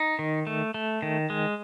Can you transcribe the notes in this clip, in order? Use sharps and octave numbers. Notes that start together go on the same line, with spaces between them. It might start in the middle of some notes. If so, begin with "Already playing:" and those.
Already playing: D#4
D#3
A3
A3
D#3
G#3